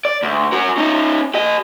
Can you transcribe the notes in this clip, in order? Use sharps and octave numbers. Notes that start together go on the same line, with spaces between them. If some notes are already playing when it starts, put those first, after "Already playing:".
D5
D2
F#4 A#4
C#4 D#4
G4 D#5